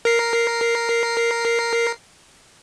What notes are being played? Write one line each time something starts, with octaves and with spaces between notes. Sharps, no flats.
A#4 C7